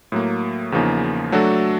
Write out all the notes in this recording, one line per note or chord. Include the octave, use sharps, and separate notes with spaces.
A2 F#3 A#3
E2 C#3 F3 A#3 D#4
F#3 A3 D4 F#4 A4